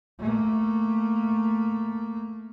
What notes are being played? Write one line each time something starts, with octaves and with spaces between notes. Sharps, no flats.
A3 A#3